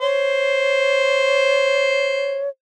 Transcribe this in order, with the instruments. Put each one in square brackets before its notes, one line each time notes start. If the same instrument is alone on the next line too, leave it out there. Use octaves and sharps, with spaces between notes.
[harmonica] C5 [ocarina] C#5